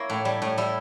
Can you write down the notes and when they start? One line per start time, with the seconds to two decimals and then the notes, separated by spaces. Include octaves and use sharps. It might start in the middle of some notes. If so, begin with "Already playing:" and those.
Already playing: A#3 E4 C#5
0.10 A2
0.25 G3
0.42 A2
0.58 G3 E4